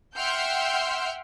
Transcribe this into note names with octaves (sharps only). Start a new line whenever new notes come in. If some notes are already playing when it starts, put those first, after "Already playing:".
E5 F#5 G5 C6 F6 G6